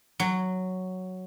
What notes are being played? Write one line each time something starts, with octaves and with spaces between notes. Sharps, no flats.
F#3